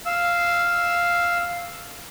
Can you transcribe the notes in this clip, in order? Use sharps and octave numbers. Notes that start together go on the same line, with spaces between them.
F5 E6